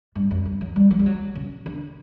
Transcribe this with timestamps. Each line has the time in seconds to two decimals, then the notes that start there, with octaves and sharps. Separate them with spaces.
0.15 G2
0.31 F#2
0.45 G2
0.61 F#3
0.76 G3
0.91 F#3
0.99 G3
1.06 F#3
1.35 C#3
1.66 D3